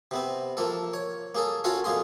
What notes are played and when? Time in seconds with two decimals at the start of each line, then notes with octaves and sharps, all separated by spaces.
0.11 C3 B3 C4
0.57 F3 A#3 A4
0.94 C#5
1.35 A#3 G#4 A4
1.64 C#4 F4 F#4 A4 C#5 F5
1.84 F2 A#2 A#3 G#4 C6